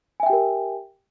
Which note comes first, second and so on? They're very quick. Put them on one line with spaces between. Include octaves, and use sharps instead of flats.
G#5 E5 G5 G4 A#4